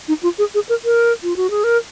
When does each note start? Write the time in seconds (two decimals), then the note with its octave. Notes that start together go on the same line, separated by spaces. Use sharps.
0.08 D#4
0.23 F4
0.38 G#4
0.54 G#4
0.69 A#4
0.85 A#4
1.23 F4
1.36 F#4
1.50 G#4
1.64 A#4